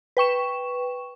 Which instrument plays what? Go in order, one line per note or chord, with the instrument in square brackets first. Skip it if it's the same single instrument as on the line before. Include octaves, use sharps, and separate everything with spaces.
[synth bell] B4 G5 C#6 E7